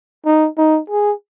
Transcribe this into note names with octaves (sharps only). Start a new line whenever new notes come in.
D#4
D#4
G#4